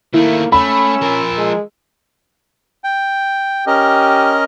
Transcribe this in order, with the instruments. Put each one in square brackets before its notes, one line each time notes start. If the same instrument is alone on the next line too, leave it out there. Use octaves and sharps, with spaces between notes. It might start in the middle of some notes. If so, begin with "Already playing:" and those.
[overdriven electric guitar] D#3 A3 [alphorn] A#3 [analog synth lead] E4
[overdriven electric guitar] A3 [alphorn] C#4 [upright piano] B5 [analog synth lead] E6
[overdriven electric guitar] F3 A#4
[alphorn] G#3
[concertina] G5
[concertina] C#4 A#4 D#5 [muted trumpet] G4